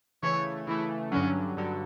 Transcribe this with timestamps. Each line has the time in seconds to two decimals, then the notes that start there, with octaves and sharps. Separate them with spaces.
0.23 C#3 E3 A3 C#5
0.67 C#3 E3 A3 E4
1.12 G2 D3 F#3 C#4
1.57 G2 D3 F#3